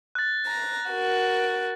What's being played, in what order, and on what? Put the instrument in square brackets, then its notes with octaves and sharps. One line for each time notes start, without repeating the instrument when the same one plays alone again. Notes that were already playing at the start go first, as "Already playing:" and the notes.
[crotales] F#6 A6
[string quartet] A#5
F#4 A#4